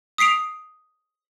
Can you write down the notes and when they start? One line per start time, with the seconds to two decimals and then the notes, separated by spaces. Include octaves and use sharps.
0.18 D#6 B6 C7 D7 F7